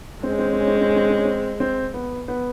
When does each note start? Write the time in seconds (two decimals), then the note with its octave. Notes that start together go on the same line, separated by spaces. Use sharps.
0.23 G#3 C4
0.31 C#4
0.39 C4
0.45 C#4
0.53 C4
0.60 C#4
0.67 C4
0.75 C#4
0.81 C4
0.89 C#4
0.96 C4
1.03 C#4
1.10 C4
1.18 C#4
1.25 C4
1.60 C4
1.94 B3
2.28 B3